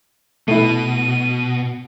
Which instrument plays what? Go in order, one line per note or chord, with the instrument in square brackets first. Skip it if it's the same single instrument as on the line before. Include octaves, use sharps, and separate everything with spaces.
[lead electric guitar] B2 [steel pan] A3 E4 [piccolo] D#7